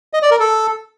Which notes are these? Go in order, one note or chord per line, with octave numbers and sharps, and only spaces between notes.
D#5
D5
A#4
A4